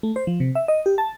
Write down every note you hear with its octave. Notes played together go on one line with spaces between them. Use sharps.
A3
C5
F3
C3
E5
D#5
G4
A5